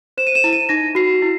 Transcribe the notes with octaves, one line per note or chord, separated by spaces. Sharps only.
C5 E7
D#7
E7
E4
D#7
D#4 A#6
F#4 C7
E4